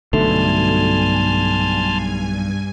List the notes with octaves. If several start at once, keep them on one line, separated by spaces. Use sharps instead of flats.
B1 G2 D3 A3 G#5 A5 C6 F6